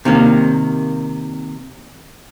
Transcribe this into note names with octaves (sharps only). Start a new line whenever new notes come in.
C3 D#3 A#3